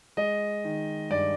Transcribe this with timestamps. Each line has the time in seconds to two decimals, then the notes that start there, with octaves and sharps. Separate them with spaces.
0.17 G#3 D#5
0.64 D#3
1.10 G2 D5